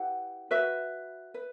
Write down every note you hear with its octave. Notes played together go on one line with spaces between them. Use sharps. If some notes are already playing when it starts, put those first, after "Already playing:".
Already playing: E4 G4 B4 F#5
F#4 B4 E5
B4